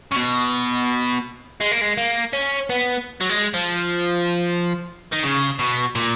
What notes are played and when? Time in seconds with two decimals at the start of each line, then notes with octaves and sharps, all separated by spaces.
0.12 C#3
0.16 B2
1.61 G#3
1.72 A#3
1.81 G#3
1.97 A#3
2.33 C#4
2.70 B3
3.21 F#3
3.29 G#3
3.54 F3
5.12 D#3
5.23 C#3
5.59 B2
5.95 A#2